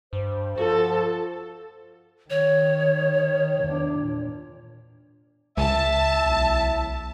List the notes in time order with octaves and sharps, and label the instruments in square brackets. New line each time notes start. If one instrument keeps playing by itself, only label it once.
[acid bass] G2 [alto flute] C5
[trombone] F3 [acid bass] F#4 [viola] A4
[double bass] D#3 [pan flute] C#5
[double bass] E2 D4
A#2
[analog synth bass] C#2 [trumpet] E5 [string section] A5
[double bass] B1 E4